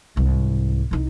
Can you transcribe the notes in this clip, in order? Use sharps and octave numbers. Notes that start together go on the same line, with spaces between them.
C2 G#2
C2 D#4